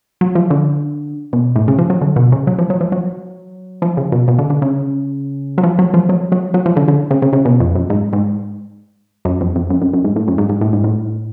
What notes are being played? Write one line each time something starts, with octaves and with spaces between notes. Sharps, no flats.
F#3
F3
D3
B2
A2
C#3
F3
F#3
D3
B2
C#3
F#3
F3
F#3
F3
F#3
F3
C#3
B2
B2
D3
D3
C#3
F#3
F3
F#3
F3
F#3
F#3
F#3
F3
D3
D3
C#3
C#3
C#3
B2
F2
F#2
G#2
G#2
F#2
F2
F2
F#2
F#2
F#2
G#2
A2
F#2
G#2
G#2
A2
G#2
A2